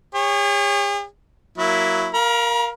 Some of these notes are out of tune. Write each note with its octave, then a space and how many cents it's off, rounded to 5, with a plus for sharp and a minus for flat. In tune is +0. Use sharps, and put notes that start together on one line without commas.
G#4 -45 C#5 +0
F#3 +0 A#3 +0 E4 +0
A#4 +0 F5 +0 A#5 +45